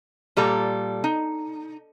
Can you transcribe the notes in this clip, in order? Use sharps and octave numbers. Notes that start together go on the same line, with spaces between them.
A#2 G3 A4 A#5
D#4